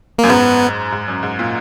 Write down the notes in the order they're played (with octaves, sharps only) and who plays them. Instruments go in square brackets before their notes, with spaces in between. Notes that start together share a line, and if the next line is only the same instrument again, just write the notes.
[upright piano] F#2 [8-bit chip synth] A#3
[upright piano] G#2 [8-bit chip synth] B3
[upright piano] G#2
F#2
G#2
A#2